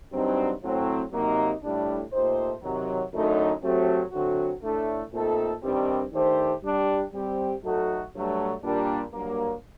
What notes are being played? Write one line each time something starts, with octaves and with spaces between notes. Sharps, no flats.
G2 F#3 C4 D#4
A2 F#3 C4
C3 F#3 A#3 D#4
A2 G3 D4
A#2 A3 D#4 G4 C5
C3 D#3 F#3
F#2 D3 A3 D#4
F#3 A3 C4 G4
D3 F#3 A3 C4 F#4
A2 A3 D4 A4
A#2 A3 C4 D#4 A4
G2 D#3 G3 C4
D#3 A3 D4 G4 C5
G3 D4 G4
G3 C4 G4
F#3 A3 D#4 F#4 A4
G2 F#3 A3
A#2 G3 A#3 D4
G2 F#3 A#3